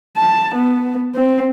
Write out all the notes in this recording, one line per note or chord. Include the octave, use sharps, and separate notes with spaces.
A5
B3
C4